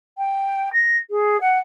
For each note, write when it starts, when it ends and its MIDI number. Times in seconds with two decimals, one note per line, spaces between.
0.18 0.73 79
0.73 0.97 94
1.10 1.37 68
1.41 1.59 78